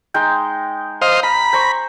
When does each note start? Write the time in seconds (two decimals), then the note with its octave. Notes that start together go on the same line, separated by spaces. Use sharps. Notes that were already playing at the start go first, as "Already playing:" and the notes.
0.14 G#3 D#4 G5
1.02 C5 D#5 F5
1.23 A#5 B5
1.53 C5 A#5 C#6